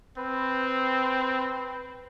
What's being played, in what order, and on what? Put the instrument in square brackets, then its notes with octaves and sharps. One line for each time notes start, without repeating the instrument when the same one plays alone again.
[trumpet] C4 [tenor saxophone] B4